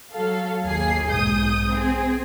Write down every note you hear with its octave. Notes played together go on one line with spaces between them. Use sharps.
F#3 A4 F5
G1 D#2 G#4 C7
B1 G#2 D#6 G6
C4 G#4